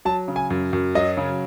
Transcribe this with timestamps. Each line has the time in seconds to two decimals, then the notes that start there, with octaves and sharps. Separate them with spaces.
0.05 F#3 A5
0.28 C#3
0.36 G#5
0.50 F#2
0.73 F#2
0.95 F#3 D#5
1.17 C#3